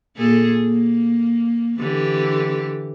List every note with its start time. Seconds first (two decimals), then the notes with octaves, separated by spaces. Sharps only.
0.17 A#2 G#4 A4
0.64 A#3
1.79 D3 E3 G4